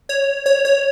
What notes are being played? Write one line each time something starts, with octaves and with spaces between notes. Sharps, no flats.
C#5
C#5
C#5